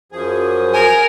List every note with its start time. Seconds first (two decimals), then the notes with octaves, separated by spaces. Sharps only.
0.12 F#2 F3 G#4
0.74 A#4 G#5